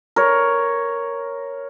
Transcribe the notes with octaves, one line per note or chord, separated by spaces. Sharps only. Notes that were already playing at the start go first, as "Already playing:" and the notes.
A#4 C#5